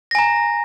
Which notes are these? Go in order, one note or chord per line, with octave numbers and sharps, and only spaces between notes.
G#5 A#5 A#6